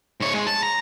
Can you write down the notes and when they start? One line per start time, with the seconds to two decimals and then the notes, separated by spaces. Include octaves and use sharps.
0.20 G#2 C#5
0.34 G#3
0.47 A5
0.63 A#5